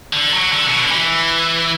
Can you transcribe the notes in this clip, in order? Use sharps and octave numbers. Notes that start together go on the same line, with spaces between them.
D3
F#3
D3
B2
D3
E3